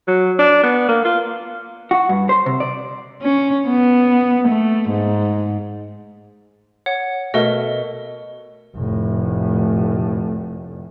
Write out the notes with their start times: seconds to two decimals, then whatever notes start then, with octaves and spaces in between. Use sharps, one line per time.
0.08 F#3
0.39 D4
0.63 B3
0.88 A#3
1.04 F4
1.91 F#4
2.09 G2
2.29 C5
2.46 C3
2.60 D5
3.22 C#4
3.68 B3
4.47 A3
4.89 G#2
6.86 C#5 F#5
7.34 B2 A3 A#4 D#5
8.76 F1 A2